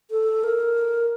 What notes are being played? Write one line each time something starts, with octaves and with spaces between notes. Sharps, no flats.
A4
A#4